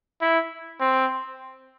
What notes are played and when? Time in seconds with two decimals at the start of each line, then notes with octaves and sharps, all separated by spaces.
0.21 E4
0.80 C4